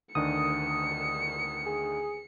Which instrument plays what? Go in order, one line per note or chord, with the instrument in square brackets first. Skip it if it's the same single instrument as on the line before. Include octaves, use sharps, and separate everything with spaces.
[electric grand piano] D2 D#3 D4 [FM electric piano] D#6 [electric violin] C#7
[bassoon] G#4